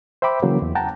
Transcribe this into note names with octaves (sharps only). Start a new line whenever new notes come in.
C5 E5 G5 B5 D6
C#3 E3 F#3 A#3
E2
F#5 G5 A5 A#5